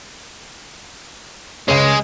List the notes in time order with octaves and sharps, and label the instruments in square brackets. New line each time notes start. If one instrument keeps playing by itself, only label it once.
[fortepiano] C#2 C#4 [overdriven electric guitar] G#3